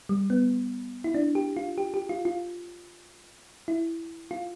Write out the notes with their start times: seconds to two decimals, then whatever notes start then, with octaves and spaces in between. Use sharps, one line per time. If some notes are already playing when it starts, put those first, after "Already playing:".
0.09 G3
0.30 B3
1.04 E4
1.15 D4
1.35 G4
1.57 F4
1.78 G4
1.94 G4
2.09 F4
2.25 F4
3.68 E4
4.31 F4